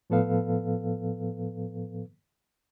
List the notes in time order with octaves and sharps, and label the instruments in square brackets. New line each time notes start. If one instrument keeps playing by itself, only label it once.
[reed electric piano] A2 F3 B3 A4 B4 F5